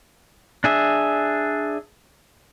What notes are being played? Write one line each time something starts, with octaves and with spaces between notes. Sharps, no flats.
D4 G#4 E5